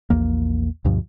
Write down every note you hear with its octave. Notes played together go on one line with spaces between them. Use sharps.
A#1 E2 A#3
D2 G2 B2 F3